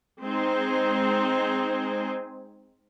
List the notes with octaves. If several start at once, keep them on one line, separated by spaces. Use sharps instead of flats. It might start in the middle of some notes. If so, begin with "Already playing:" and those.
G#3 C4 D#4 C5 G#5